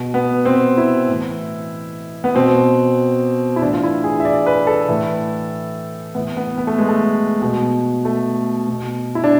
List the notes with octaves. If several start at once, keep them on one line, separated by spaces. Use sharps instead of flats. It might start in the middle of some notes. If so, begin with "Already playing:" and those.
Already playing: B2
B3
C4
E4
A2 E3
B3
B2 C4
E4
A2 E3 D4
F4
E4
G#4
E5
D5
B4
A4
A2 E3
A2 E3 B3
B3
B3
A3
G#3
A3
B2
A3
B2
E4
D4